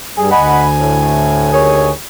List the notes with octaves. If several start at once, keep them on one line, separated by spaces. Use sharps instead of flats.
G2 G3 G#4
D2 D#5 F#5 G#5 B5
A2
D#2 G#4 C#5